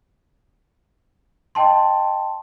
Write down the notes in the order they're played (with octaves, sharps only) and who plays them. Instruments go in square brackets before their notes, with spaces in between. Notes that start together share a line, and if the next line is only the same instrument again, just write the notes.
[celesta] D#5 G5 A5 C6